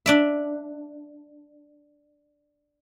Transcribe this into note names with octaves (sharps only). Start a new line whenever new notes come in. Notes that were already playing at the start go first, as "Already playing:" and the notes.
D4 D5 E5